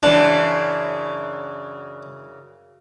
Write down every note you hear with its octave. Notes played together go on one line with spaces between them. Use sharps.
F#2 C#3 E3 D4